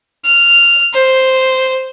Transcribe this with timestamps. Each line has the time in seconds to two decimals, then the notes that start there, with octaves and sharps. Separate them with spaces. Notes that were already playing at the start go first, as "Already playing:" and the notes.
0.25 F6
0.94 C5